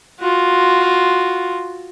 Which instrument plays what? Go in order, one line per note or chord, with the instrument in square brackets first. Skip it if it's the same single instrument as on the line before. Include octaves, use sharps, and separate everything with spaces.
[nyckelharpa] F4 F#4